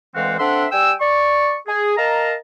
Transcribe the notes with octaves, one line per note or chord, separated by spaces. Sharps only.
D2 E3 G#3 C4 F5 F#5
C4 D4 A4 E5 F#5 C6
G3 G5 G#5 E6
D5 C#6
G#4
A#4 D#5 F5 A5 A#5